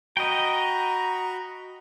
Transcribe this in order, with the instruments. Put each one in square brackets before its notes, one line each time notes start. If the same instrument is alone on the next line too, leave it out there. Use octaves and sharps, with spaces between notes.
[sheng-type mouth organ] F#4 B5 C#6 [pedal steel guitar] D#5 G5 [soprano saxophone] A#5